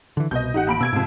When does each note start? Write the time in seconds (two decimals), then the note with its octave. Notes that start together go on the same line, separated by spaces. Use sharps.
0.17 D3 E3
0.31 C2 B2 D#5 G6
0.54 A1 D#4 G4 F#5
0.67 D#2 B5 D7
0.81 B2 E6 G#6 D7
0.92 B1 F2 G#2 C3